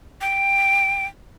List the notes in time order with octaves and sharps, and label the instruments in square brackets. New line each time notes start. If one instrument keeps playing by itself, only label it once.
[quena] G5